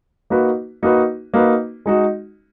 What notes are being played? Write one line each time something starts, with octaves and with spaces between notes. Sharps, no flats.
A#3 D#4 F#4 B4
A#3 D#4 F#4 B4
A#3 D#4 F#4 B4
G#3 D#4 F#4